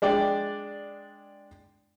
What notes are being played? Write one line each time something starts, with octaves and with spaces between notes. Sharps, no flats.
G#3 D4 D5 G5